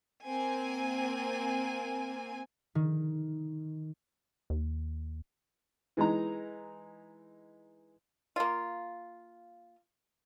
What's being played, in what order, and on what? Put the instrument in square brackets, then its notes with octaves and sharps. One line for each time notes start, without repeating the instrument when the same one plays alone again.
[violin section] A#3 C4 G#5
[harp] D#3
[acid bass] D#2
[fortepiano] E3 G#3 D#4 A#5
[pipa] A#3 F4